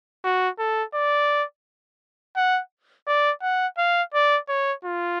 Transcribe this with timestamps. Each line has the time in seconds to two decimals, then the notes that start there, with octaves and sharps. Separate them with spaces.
0.24 F#4
0.59 A4
0.94 D5
2.36 F#5
3.07 D5
3.42 F#5
3.78 F5
4.14 D5
4.49 C#5
4.85 F4